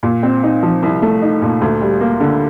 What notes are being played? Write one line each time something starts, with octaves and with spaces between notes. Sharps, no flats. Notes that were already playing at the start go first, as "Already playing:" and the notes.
A#2
C4
D#4
F3
C2
A3
D#4
A#2
D2
G3
A#3
D3